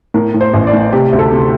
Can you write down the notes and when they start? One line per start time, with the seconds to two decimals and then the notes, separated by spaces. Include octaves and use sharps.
0.14 A2 A#4
0.34 A2
0.41 C5
0.54 A1
0.67 D5
0.73 A2
0.92 C3 G4
1.13 D2
1.19 A4
1.32 C3